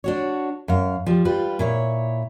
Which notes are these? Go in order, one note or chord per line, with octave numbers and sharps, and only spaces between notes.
D4 F#4 C#5
F#2 F5
F3 G3
G3 F4 B4
A#2 E4 C#5